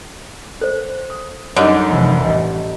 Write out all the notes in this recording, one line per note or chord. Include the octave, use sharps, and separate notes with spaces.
A4 C5 F#6
D#6
F#2 D3 G3 D#4 C#5 D#5
F1 E3
A1 D#5